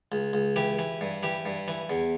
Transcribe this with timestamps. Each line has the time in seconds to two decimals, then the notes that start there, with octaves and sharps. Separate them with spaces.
0.12 C#2
0.33 C#2
0.56 E3 G4
0.79 E3
1.01 G2
1.23 E3 G4
1.45 G2
1.68 E3
1.90 E2